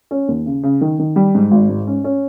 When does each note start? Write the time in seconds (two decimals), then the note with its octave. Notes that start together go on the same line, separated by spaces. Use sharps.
0.11 C#4
0.28 D#2
0.46 C#3
0.63 C#3
0.81 D#3
0.99 D#3
1.16 G3
1.35 G#2
1.51 G#1
1.69 G#2
1.87 C#4
2.04 C#4